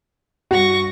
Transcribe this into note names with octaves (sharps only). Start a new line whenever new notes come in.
G2 F#4 C#6 A#6